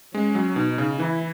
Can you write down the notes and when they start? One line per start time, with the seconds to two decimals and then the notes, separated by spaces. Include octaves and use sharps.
0.14 G#3 C#4
0.35 F#3
0.56 B2 D#4
0.78 C#3
0.99 E3 E4